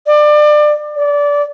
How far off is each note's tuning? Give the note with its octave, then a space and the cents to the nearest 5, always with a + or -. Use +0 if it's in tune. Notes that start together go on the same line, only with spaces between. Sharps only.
D5 +25
D5 -20